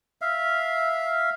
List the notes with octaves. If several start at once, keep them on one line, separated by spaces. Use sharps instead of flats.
E5 F5